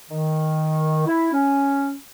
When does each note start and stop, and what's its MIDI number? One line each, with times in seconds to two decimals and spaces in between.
0.09 1.03 51
1.06 1.30 64
1.32 1.93 61